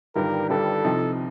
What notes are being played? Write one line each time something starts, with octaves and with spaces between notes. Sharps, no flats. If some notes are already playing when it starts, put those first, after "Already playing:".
G1 G2 D#3 G3 A#4
G1 G2 D#3 G3 A4
C2 C3 F3 C4 D#4